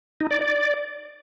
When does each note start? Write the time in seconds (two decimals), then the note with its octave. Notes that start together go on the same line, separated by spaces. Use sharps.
0.20 D#4
0.31 D5
0.41 D5